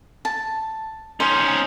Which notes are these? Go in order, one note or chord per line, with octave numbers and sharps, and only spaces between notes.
A5
C#4 D#4 C5